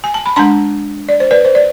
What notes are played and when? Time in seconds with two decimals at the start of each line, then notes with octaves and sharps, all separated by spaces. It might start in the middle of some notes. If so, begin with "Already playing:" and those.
0.04 G#5
0.14 A5
0.26 B5
0.36 G#3 D4 A5 C6
1.09 D5
1.20 C5
1.31 B4 D5
1.45 C5
1.55 D5